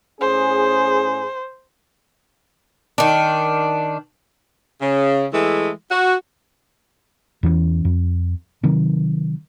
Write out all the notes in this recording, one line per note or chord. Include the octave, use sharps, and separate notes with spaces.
A2 C#4 G#4 C5
D#3 D4
C#3
E3 G#3 A3
F#4
E2 E3 F3 C#4
F2
C3 D#3 F#3